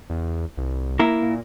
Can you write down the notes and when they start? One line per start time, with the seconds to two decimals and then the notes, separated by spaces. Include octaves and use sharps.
0.10 E2
0.57 C2
0.99 A#3 E4 A#4
1.22 A#2